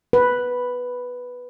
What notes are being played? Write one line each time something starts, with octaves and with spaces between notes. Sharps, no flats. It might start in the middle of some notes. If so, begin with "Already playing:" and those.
B4